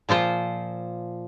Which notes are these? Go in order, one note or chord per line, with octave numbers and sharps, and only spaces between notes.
A#2 F3 F4 C5